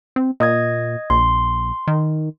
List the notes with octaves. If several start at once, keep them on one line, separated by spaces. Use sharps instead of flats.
C4
A#2 D#5 D#6 G#6
A#1 C6
D#3